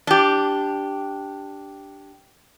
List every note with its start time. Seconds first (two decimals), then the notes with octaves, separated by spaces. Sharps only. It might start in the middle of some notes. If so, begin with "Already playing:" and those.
0.07 D4 G4